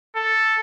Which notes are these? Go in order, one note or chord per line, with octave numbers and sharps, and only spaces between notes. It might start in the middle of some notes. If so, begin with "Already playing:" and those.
A4